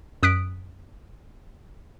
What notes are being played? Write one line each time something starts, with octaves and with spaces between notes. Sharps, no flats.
F#2 D#6 F#6 B6 D7